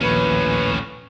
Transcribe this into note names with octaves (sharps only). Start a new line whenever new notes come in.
A#1 D#2 A2 C#4 B4